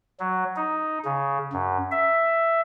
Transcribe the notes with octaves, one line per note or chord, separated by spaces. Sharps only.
F#3
D#4
C#3
F#2
E5